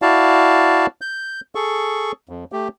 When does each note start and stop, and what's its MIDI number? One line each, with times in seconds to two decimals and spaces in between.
0.02 0.86 64
0.02 0.86 66
0.02 0.86 74
0.02 0.86 77
0.02 0.86 81
1.01 1.41 91
1.55 2.12 68
1.55 2.12 69
1.55 2.12 85
2.29 2.44 41
2.52 2.68 57
2.52 2.68 67